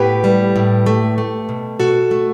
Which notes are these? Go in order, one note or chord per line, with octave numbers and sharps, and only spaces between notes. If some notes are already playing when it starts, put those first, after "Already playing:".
Already playing: A2 B3 G4 B4
G3
A2
A3
A3
B2
B2 F#4 A4
A3